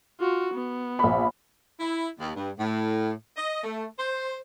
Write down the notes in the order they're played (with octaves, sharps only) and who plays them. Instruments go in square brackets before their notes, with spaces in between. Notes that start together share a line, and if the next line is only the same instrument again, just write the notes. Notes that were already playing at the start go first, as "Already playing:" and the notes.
[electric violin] F4 F#4
B3
[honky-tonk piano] A#1 B5
[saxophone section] E4
D#2
G2
A2
D#5
A3
C5